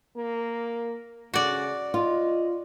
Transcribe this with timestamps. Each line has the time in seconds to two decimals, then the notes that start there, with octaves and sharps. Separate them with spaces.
0.17 A#3
1.34 C#3 F#4 D5
1.94 F4 D#5